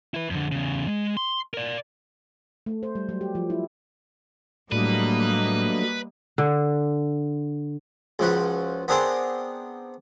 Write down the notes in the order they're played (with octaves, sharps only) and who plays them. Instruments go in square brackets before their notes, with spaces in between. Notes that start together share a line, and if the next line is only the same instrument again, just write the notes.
[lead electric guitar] E4 B4
F2 D3
E2 C#3
G#3
C6
A#4 D5
[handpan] A3
C5
G3
F#3
G4
F3
E4
[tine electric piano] A2 [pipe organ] F#3 A3 D4 [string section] G3 A#3 D#5 [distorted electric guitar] B4
[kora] D3
[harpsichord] C#2 F3 F#4 B4
B3 C4 D4 G#4 A#4 C5